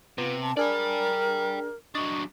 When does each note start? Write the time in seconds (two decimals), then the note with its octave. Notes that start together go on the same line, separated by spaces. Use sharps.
0.18 C3 B3 F4
0.42 A5
0.57 D4 G#4 A#4 D5 G5
1.95 F#3 D4 D#5 C#6